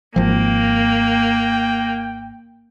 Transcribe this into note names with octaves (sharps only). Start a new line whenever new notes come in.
G#1 F3 A#3 G5